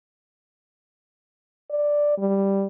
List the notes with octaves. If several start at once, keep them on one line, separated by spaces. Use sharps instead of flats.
D5
G3